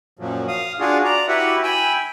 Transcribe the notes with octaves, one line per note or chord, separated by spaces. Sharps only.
F#2 A#2 F3 F#3
F5 D#6
D4 F4 F#4 G#4
D5 A#5
E4 F#4 G4 B4 E5 F#5
G5 G#5 B5 E6